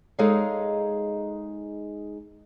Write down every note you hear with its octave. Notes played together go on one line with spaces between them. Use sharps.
G#3 D#4 G#4 A4 C#5 F5